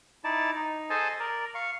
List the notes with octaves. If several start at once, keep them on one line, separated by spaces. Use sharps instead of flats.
D#4 E4 D5 A5
D#4
G#4 A4 C5 D#5 G#5 A5
A#4 D5
F5 C#6